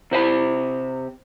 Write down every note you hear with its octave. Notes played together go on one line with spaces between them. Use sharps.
C3 C5 D#5 B5